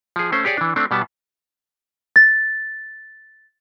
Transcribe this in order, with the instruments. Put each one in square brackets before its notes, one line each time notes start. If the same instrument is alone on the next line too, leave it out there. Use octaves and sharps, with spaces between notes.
[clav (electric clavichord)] F3 G#4
A3 C#4 C5
G4 G#4 C#5 D5
E3 D4
A3 C4 D4
B2 G3 B3 A5
[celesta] A6